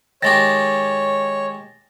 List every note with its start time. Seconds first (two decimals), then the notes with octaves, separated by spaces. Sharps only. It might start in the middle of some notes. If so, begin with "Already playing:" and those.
0.23 D#3 G#3 G4 C#5 A6 A#6